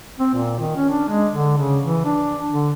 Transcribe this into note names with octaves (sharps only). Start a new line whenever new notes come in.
C4
A#2
D#3
C#4
D4
G#3
D3
C#3
E3
D4
D3